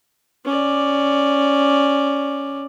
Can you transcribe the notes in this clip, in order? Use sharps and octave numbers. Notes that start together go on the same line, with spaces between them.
C#4 D5